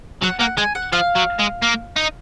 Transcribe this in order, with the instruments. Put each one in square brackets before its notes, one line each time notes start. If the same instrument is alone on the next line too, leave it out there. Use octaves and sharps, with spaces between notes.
[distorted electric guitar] F#3 [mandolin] F#5
[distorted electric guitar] A#3 [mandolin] F#5
[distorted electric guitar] G#3 [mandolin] G#5
[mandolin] F#5
[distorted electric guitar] F3 [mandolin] F5
[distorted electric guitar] F#3
G#3
A#3
D#4